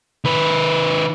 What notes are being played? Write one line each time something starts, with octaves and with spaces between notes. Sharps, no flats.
D#3 B4